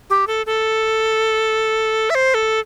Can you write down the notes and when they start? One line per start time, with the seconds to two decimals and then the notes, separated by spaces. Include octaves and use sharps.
0.10 G4
0.27 A4
0.46 A4
2.10 E5
2.15 C5
2.34 A4